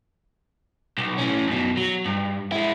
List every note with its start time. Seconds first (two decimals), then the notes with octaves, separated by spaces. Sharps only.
0.98 B1
1.18 A2 C#4
1.48 F#2 B2
1.77 F#3
2.05 G2
2.52 G#3 E4